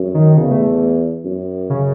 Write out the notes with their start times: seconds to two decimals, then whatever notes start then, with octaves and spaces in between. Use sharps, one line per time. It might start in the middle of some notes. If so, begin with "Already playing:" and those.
Already playing: F#2
0.14 D#3
0.37 E2 C#3
0.51 A3
1.25 F#2
1.70 C#3